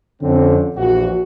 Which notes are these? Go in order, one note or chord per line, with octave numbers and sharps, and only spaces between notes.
F2 D3 C4 C#4
A#1 E2 F#4